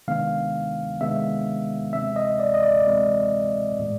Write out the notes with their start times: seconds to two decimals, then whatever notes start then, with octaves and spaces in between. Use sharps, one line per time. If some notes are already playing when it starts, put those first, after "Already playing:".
0.08 C3 D#3 G#3 B3 D4 F5
1.01 C3 D#3 G#3 B3 D4 E5
1.93 C3 E3 G#3 C4 E5
2.16 D#5
2.40 D5
2.54 D#5
2.63 D5
2.87 C3 E3 G#3 C4
3.79 A2 E3 G#3 B3